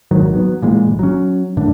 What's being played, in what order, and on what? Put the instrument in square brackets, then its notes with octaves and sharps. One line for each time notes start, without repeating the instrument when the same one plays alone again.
[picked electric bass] D1 G#1 D#3 F#3
F#3 B3
A#2 E3 G#3
G1
F#3 C#4
F#2 A2 D3